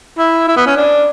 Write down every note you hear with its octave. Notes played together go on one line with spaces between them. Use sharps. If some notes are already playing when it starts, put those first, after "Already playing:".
E4
E4
B3
C#4
D4